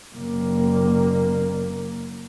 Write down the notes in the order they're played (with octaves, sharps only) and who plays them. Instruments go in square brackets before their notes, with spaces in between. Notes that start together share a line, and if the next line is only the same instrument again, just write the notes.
[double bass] F#1 A#3